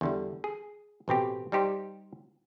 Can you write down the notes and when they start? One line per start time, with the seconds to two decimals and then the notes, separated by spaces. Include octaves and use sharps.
0.01 E2 D3 G3
0.44 G#4
1.08 A1 B2 C4 G4
1.52 G3 D#4 G4 C5 D5